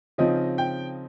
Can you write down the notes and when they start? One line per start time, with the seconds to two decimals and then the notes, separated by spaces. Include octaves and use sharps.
0.18 C#3 F3 C4 D#4 D#5
0.58 G5